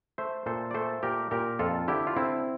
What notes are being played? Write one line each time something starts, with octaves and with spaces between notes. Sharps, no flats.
A3 C5 E5
A#2 A4 C5
D5
A3 A4 C5
A#2 G4 A#4
A#2 G4 A#4
F2 F4 A4
D3 E4 G4
F4
D3 C4 E4